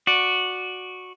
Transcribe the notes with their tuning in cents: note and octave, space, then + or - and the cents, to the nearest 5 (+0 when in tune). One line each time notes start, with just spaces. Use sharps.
F#4 -10 D5 +5